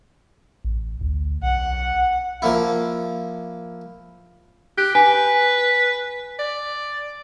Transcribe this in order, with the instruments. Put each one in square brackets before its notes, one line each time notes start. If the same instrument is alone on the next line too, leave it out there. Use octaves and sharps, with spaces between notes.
[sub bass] A1
D2
[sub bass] B1 [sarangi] F#5
[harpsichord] F3 A#3 E4
[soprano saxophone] G4 [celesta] F#6
[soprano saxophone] B4 [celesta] G#5
[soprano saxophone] D5